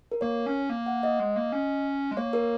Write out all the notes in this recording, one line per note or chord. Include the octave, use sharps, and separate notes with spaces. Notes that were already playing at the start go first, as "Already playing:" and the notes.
A#4
A#3 C#5
C#4
A#3
F#5
D#5
G#3
A#3
C#4
G#3
A#3 C#5
A#4